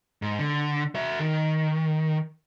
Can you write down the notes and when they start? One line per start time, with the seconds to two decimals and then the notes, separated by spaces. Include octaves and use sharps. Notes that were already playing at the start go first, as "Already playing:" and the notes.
0.22 G#2
0.39 D3
0.95 F#4 E5
1.19 D#3